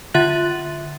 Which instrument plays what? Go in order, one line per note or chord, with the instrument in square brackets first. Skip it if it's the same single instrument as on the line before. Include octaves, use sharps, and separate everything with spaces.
[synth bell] D3 F4 E5 F#6 A6 F#7